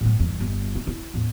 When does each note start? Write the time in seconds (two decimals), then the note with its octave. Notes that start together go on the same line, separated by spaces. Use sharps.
0.01 F#2 A2
0.20 E2 G2
0.40 G1
0.75 A3
0.87 E4
1.14 E2 A2